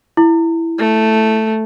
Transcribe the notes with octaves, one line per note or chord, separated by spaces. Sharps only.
E4
A3